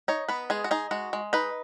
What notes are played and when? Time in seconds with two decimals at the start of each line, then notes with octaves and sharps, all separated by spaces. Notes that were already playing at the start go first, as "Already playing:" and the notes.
0.08 D#4 C#5
0.28 B3 B4
0.50 G#3 G#4
0.64 F#4
0.71 D#4 G#4
0.91 G#3 F#4
1.13 G#3
1.33 D#4 B4